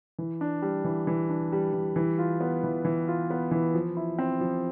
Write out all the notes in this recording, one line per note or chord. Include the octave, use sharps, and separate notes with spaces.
E3
D4
G3
E3
E3
D4
G3
E3
E3
F4
B3
E3
E3
F4
B3
E3
F3
E4
C4
F3